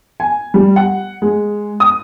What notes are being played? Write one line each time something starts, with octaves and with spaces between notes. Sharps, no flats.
G#5
G3
F#5
G#3
D#6